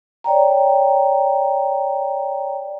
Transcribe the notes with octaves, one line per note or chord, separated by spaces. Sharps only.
C#5 D5 G5 A#5